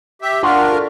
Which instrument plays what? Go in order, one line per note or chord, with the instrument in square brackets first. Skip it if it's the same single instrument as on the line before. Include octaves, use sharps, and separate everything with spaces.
[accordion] G4 E5
[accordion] D4 F4 A#4 [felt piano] F#5 C6 C#6
[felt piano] A4